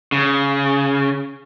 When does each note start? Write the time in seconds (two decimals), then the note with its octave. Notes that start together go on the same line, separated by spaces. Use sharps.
0.12 C#3